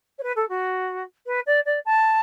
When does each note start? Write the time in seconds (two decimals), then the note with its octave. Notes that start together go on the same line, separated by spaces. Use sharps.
0.18 C#5
0.23 B4
0.36 A4
0.49 F#4
1.27 B4
1.46 D5
1.66 D5
1.85 A5